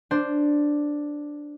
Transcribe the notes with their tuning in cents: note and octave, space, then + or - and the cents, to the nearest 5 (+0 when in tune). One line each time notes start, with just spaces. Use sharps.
D4 +0 C5 +0